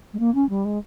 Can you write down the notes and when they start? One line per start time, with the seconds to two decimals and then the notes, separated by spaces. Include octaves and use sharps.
0.13 G#3
0.19 A#3
0.35 C#4
0.49 G3
0.65 G#3